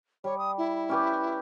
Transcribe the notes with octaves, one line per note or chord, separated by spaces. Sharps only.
G3 C#5
D#6
E4
C#4 G4 B4